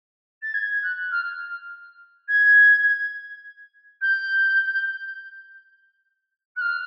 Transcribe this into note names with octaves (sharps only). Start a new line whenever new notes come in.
A6
G#6
F#6
F6
G#6
G6
F#6
F6